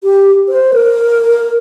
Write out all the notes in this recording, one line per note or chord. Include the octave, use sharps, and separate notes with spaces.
G4
C5
A#4